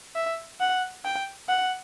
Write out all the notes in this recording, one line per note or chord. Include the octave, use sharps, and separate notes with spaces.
E5
F#5
G5
F#5